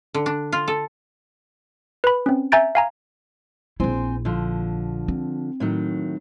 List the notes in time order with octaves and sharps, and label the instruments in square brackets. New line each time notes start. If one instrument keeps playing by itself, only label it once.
[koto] D3
D4
F4
A4
[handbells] B4 B5
C4 C#4
E5 G#5 A#5 G6 A6 D7
F5 G#5 A#5
[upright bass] A#1 E4 [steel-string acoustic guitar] C4 C5 G#5
[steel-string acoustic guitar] D3 F3
[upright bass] C4
[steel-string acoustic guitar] A2 D#3 F#3